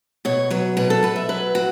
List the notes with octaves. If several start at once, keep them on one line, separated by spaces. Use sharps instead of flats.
B2 C#5
F#3 B4
B2 B4
A4
B2 B4
E5
F#3 B4
F#3 F#4